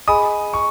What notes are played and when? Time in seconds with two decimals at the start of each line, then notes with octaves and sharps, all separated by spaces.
0.08 G#4 D#5 G#5 B5 D#6
0.53 C#6